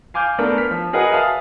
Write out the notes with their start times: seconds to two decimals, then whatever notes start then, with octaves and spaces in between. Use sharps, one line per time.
0.14 F5 G#5 D6 F6 G6
0.39 A3 B3 D4 A#4
0.58 F6 B6
0.71 F3
0.93 F#4 G#4 A#4 B4 D#5 F#5
1.12 E5 F5 G#5 A5 D#6 F6